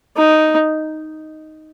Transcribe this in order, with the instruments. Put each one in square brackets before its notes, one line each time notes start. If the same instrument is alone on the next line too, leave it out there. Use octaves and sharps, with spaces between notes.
[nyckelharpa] D#4